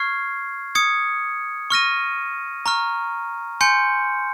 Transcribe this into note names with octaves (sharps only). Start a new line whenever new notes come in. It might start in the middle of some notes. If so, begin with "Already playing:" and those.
Already playing: C#6 F6 G#6 C7
D#6 G#6 C#7
C#6 F6 A#6 D#7
A#5 C#6 F6
G#5 C6 G6 C#7